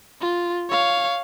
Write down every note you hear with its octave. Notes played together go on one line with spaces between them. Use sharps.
F4
C#5 F5